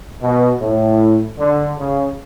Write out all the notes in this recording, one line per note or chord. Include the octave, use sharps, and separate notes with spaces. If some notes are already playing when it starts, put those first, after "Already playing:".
B2
A2
D3
C#3